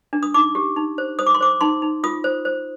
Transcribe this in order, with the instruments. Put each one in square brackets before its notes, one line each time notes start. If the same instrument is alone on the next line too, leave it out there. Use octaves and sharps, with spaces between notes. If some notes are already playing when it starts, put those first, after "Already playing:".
[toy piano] D4
D#6
D#4 D6
G4
D#4
C5
C5 D#6
D6
C6
C5 D6
D#4 C6
D#4
F4 D#6
C5
C5